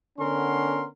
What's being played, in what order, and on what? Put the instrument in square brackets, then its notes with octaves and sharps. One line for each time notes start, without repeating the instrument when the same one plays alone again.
[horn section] D3 B3 C#4 A#4 C6